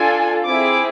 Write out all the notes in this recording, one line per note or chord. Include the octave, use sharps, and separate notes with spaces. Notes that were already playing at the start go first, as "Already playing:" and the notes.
Already playing: D4 F4 A4 G#5
C4 E4 G#4 D6